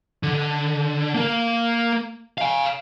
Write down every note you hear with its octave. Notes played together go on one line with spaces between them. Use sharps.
D3
A#3 A#4
F5 G#5